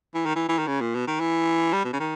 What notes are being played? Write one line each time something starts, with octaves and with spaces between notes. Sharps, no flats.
E3
D#3
E3
E3
D#3
C#3
A#2
B2
D#3
E3
G3
B2
C#3
D#3